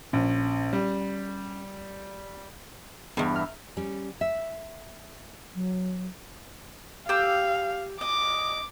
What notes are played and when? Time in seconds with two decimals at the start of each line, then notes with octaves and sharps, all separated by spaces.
0.13 A#1 C#4
0.73 G3
3.17 E2 G2 B3 G#4 D#5
3.36 E5 A#5 F6
3.77 G3 C#4
4.21 E5
5.55 F#3
7.09 G4 F5 E6
8.01 D#5 D6